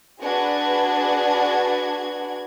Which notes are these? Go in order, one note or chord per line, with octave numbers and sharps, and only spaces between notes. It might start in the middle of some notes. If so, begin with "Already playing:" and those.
D4 F#4 G#4 B4 G#6